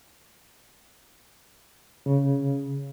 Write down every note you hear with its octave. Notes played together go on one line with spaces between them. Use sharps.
C#3